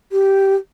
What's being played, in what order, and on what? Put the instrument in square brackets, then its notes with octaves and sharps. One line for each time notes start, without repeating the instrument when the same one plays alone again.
[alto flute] G4